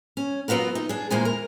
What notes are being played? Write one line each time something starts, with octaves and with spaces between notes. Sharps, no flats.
C#4
F#3 B3 F4 F#4 A#4
D#4
D4 G#4
E2 A#2 G3 G#3 C5 G#5
A#4